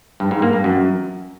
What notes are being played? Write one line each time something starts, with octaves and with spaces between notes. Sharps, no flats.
G2
G#2
A#3
G2
F#2